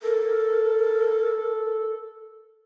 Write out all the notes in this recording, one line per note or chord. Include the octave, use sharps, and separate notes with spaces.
A4 A#4